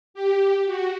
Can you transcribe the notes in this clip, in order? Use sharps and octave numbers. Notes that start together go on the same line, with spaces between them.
G4
F#4